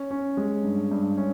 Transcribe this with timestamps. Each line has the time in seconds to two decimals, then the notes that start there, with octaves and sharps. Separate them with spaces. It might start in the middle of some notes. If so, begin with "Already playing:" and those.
Already playing: C#4
0.11 C#4
0.37 G#3
0.64 G2
0.91 G2
1.17 C#4